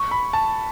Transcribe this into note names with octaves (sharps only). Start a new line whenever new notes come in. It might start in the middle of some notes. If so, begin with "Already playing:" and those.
Already playing: C#6
B5
A5